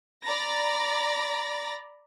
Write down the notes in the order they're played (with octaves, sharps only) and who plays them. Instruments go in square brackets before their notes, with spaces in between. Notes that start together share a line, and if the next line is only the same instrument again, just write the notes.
[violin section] D5 A#5 B5 A6 A#6